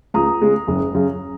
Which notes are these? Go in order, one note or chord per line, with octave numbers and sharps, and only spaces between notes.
C#2 A#5 D#6
C#3 G#3
F#1
F#2 C#3